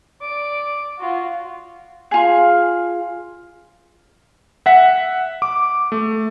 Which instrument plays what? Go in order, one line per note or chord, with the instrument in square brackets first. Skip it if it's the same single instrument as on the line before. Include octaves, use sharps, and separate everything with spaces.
[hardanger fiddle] D5 D6
F4 F#4
[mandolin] F4 G#4
[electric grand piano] E5 F#5 B6
D6
A3